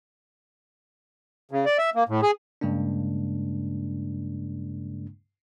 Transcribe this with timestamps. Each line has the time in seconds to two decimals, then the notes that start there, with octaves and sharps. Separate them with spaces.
1.51 C#3
1.65 D5
1.78 E5
1.95 A#3
2.09 A2
2.22 G#4
2.61 G2 C#3 G#3 A#3 D4